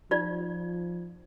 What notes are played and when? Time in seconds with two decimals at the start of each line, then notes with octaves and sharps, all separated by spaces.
0.11 F3 D#4 F4 D5